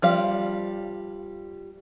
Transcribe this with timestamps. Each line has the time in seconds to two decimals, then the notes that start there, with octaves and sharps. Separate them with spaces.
0.02 F3 G3 F5